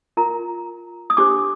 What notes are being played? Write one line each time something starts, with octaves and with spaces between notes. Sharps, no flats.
F4 A#4 A#5
D#6
D4 G4 C5 D6